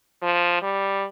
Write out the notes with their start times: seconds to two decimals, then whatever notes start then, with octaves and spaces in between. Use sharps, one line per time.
0.22 F3
0.62 G3